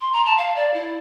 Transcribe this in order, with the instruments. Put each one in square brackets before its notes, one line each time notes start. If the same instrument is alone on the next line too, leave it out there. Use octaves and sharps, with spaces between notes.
[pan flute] C6
A#5
A5
F5
D5
E4